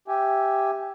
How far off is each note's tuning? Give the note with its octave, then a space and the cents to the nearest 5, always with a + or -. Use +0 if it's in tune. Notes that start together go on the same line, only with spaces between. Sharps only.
G4 +0 E5 +0 G#5 +0